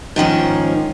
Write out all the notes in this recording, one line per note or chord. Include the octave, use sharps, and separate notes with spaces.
G#2 D#3 F3 C#4